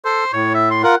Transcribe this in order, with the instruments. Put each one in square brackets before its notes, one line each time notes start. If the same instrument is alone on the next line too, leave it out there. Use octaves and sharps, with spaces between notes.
[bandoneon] A4 [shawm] C5
[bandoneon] A2 [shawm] C#5
[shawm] E5
C6
[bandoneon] F4 A#4 [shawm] F#5